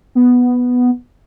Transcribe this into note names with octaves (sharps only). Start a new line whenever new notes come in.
B3